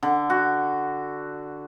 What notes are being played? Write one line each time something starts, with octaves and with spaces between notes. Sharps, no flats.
D3
F#4